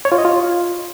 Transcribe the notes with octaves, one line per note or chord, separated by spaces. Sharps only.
C#5
F4
D#5
F4